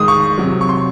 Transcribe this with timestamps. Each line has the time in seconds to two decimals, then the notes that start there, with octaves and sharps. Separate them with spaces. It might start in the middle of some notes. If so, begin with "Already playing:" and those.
Already playing: G#2 D#3 G#3 D#6
0.08 C#6
0.38 C3 F#3
0.61 C#6
0.69 C6